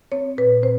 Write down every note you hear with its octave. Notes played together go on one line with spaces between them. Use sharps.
C4 C#5
A#2 B4
C4 C5